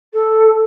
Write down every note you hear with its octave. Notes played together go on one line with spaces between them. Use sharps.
A4